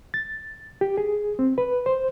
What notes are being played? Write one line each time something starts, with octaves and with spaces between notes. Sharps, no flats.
A6
G4
G#4
C4
B4
C5